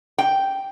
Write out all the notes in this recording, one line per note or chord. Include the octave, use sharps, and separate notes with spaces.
G5